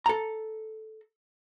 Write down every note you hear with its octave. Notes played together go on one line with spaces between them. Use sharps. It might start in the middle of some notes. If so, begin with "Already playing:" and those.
A4 A#5